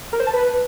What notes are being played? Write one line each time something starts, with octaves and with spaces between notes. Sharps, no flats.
A#4
C5
A5
B4